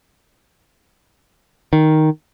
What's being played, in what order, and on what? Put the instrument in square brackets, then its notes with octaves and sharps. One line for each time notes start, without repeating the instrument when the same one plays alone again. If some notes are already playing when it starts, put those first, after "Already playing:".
[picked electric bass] D#3